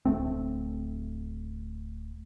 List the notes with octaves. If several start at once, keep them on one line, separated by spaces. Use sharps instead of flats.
D1 E2 A3 C4